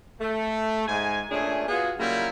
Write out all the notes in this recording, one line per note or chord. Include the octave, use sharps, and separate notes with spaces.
A3
G#2 G#5
A#2 A3 C#4 D4 G#4
B3 F4 F#4 G#4
C#3 F#3 G3 A#3 E4 F4